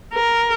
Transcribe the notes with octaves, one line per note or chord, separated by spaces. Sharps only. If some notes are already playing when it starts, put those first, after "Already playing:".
A#4